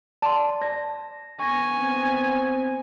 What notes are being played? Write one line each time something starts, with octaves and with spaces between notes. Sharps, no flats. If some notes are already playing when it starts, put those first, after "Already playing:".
D5 A5 C6
D5 A5 A#6
B3 G#5 C#6 A#6
C4